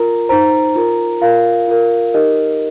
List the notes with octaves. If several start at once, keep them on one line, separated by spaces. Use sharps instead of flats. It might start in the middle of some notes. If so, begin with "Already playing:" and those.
Already playing: F4 A#4 A#5
D#4 C5 A#5
F4 A#4
F4 A#4 F5
F4 A#4
D#4 G4 A#4 D#5